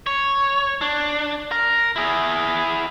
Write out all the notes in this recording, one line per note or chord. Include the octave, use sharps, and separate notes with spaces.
C#5
D4
A#4
E4 G#4